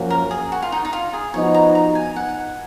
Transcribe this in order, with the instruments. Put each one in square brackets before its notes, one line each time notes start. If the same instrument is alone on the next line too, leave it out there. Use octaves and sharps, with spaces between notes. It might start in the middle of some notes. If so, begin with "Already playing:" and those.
Already playing: [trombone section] F#2 F3 A#3 C#4 F#4
[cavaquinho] A#4
G#4
F#4
F4
D#4
D#4
F4
G#4
[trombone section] F3 B3 D#4 F#4 [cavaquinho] C#5
[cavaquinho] A#5
A#5
G#5
F#5